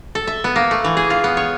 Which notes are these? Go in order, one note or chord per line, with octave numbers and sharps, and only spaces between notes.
A4
E5
B3
A#3
A3
E3
G#4
F4
B3
C#5